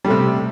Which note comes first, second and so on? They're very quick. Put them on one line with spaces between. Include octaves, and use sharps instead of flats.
G3 A3 C3